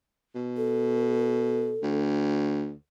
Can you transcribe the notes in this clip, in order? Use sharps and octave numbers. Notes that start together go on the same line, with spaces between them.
B2
A4
D2